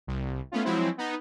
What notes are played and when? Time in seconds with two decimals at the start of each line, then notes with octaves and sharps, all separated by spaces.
0.07 C2
0.52 A3 B3 C#4 F4
0.64 F3 F#3 G#3 C4 E4
0.98 B3 D#4